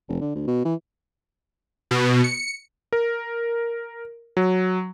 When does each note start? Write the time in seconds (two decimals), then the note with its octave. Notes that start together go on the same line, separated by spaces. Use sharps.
0.09 F1
0.21 D3
0.35 D2
0.47 B2
0.65 E3
1.91 B2
2.24 C#7
2.93 A#4
4.37 F#3